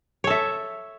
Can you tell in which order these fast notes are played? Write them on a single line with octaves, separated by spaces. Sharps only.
C#5 A4 E5